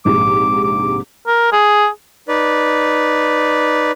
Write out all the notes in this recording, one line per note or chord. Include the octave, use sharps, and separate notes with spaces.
A#1 G#2 C3 D6
D6
A#4
G#4
D#4 B4 D5